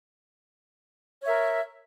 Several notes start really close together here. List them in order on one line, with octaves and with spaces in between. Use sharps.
C#5 E5 A#4